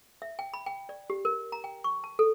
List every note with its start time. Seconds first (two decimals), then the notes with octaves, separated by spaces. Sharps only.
0.22 E5
0.39 G5
0.54 B5
0.66 G5
0.89 D5
1.10 G4
1.25 A#4
1.52 A#5
1.64 G5
1.84 C#6
2.04 A5
2.19 A4